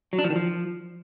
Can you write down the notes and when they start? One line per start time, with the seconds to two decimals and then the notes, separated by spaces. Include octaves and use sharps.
0.13 F#3
0.19 D4
0.24 F3
0.30 D#3
0.36 F3